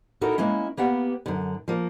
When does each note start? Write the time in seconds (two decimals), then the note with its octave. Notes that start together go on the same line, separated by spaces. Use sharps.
0.21 D#4 E4 F#4 A4 A#4
0.38 G#3 A#3 C#4 E4
0.77 A#3 B3 G4 F#5
1.26 F#2 D3
1.68 F3 A#3